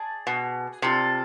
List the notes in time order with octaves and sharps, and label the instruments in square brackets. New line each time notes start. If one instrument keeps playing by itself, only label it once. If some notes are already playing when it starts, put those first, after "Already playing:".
Already playing: [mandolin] G#4 D5 A5
[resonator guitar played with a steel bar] B2
[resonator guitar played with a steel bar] C3 [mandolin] F4 A4 D5